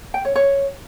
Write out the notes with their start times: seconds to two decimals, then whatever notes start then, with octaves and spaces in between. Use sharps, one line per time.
0.14 G5
0.25 C#5
0.35 C#5